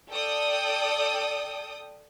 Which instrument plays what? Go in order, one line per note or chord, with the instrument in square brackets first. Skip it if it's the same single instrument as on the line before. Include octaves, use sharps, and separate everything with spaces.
[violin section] A4 D5 G5 D#6